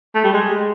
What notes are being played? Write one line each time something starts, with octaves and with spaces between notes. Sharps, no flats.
A3
G3
G#3